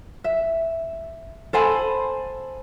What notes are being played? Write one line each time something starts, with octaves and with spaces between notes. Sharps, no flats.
E5
A4 C5 G#5 B5